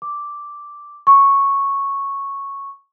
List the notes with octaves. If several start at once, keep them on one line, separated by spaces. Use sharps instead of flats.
D6
C#6